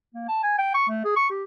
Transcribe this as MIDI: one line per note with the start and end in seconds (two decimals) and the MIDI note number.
0.14 0.24 58
0.28 0.42 81
0.43 0.55 80
0.58 0.74 79
0.74 0.87 85
0.89 1.04 57
1.04 1.15 68
1.16 1.28 85
1.30 1.43 67